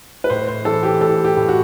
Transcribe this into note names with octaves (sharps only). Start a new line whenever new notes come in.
B4
A2 C5
C5
E3 A4
G4
A2 A4
G4
A2
F#4